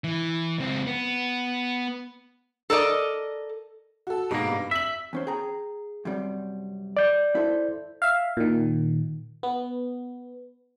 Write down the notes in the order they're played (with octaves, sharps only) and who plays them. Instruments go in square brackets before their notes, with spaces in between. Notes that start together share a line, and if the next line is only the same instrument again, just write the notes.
[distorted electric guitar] E3
C#2 C4
B3
[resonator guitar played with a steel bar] A4 A#4 D5 D#5
[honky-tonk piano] F#4 A4
[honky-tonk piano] G#2 [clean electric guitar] B2 A#3
[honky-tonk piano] G2
[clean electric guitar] E5 [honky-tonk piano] B6 F#7
[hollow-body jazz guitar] E2 C#4 C5
G#4 G5 A#5
F#2 C3 G3
[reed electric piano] D5 G6
[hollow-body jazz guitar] E4 A4 C5
[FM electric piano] E5 F5
A#2 D#3
B3